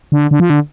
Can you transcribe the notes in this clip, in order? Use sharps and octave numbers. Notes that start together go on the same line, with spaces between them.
D3
D3
F3
D3